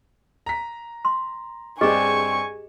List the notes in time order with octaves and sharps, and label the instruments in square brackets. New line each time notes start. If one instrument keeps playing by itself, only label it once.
[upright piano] A#5 B6
[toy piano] C6
[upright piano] G2 C4 D4 [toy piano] G4 G#4 D#5 [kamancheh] G#5 C#6